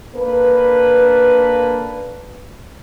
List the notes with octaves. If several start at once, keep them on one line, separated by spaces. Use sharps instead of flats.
A#3 D4 A4 B4